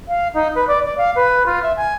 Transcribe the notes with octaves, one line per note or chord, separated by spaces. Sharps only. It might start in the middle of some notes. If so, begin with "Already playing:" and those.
F5
D#4
B4
D5
D5
F5
B4
F4
E5
G#5